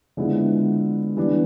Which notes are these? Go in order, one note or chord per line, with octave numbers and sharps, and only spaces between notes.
D3 F3 G#3 B3 E4
E3 G3 B3 D4